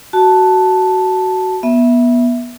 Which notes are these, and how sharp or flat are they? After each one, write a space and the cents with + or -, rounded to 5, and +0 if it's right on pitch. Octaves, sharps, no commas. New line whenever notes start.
F#4 +10 A5 +0
B3 -25 E5 +0